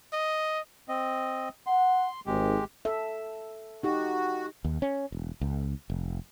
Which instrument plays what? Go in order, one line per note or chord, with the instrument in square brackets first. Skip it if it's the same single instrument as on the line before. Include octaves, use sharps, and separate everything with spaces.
[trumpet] D#5
[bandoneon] C4 D#5
[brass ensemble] F#5 [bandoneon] C6
[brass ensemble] G#1 [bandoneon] G#3 G4
[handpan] A4 E5
[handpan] D#4 G4 [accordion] F#4
[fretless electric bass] D#2
C#4
E1
C#2
F1